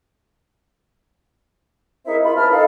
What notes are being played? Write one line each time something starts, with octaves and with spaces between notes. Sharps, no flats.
C4 D#4 E4 G#4 A#4 E5
F4 B5
C#2 B3 A5 B5 F6
D#4 A4 F5